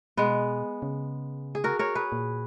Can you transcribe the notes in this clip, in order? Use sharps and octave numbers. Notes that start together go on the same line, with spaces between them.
B2 G#3 B3
C#3
G#4
F#4 A#4
A#4 C#5
G#4 B4
A#2